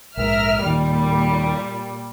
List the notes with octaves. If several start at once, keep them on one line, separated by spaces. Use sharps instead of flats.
A#1 G#2 A#4 E5 F6
D#2 A#2 D#3 G3